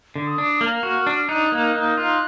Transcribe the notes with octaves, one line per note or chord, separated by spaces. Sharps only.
D3
D#6
D4
A#3 F6
F#4
D4
D#4 F#6
A#3
D#4
F4 F#6